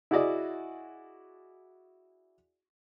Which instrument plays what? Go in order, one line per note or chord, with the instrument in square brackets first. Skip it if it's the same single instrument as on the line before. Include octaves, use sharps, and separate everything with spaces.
[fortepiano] E4 F#4 G#4 D5 D#5